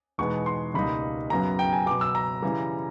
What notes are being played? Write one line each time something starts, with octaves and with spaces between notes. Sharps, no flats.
E2 B2 G#3 B3 D#4 C#6
C6
C#2 B2 G3 A#3 D#4 B5
F#2 C#3 F#3 B3 A#5
G5
G#5
B2 F#3 B3 D6
E6
A#5
C#3 E3 G3